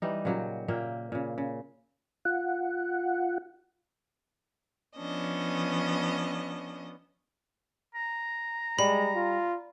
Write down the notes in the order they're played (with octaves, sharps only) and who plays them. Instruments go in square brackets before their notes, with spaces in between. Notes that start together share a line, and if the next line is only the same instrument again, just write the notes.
[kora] E3 G3 D#4
A#2 C#3 F#3 G4
A#2 A#3 E5 G5
A#2 C#3
C#3
[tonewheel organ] F4 F#5
[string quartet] F3 B3 C#4 D4 D#5
[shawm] A#5
[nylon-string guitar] G3 [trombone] G#3 [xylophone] B5
[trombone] F4